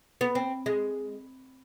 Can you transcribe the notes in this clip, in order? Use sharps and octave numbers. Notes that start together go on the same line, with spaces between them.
B3
C4
G#3